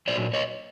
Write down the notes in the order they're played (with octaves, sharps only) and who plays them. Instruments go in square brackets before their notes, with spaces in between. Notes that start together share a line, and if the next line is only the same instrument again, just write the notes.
[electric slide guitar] A#2 F#3 C5 D5
C#5 D#5